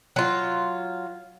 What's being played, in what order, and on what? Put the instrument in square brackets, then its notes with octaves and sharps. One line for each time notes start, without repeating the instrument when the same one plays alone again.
[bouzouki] F#3 F4